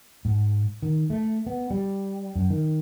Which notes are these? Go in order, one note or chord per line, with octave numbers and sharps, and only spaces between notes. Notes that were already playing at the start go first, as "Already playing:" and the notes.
G#2
D#3
A3
B3
G3
F#2
D#3